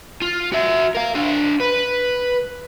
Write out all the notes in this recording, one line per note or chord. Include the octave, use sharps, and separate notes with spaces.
F4
F#4 E5
A#4 F5
D4 C5
B4